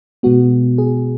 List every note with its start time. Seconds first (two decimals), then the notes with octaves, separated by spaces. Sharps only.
0.23 B2 G#3 B3 F#4
0.78 G#4